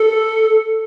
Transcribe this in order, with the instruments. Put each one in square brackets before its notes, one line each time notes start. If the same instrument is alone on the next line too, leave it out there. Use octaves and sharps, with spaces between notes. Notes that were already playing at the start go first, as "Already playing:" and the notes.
Already playing: [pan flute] A4